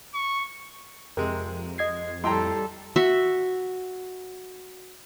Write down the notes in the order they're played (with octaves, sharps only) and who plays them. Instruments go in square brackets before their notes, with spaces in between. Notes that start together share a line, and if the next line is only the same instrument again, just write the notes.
[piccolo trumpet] C#6
[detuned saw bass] F2 [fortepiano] C3 G#3 [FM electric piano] A#4
[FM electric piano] D#5 G#6 C7
[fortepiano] A2 G5 A#5 [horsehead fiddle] G3 A4 [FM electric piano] C6
[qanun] F#4 E5